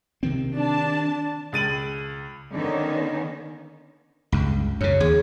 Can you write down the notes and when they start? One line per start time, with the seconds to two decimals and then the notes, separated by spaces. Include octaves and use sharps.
0.23 C3 D#3 C4
0.54 D4 A5
1.52 C#2 A6 D#7 F#7
2.56 D3 D#3 A#3 B3 C#4 D#4
4.32 C#2 G2
4.81 F#2 C#3 C#5
5.01 D#2 G#4